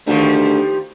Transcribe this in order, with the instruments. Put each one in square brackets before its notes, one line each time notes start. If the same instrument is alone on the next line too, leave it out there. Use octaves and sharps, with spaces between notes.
[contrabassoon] D2 [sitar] D#3 F3 G3